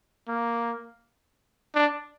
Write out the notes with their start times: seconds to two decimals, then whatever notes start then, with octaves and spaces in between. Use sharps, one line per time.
0.28 A#3
1.75 D4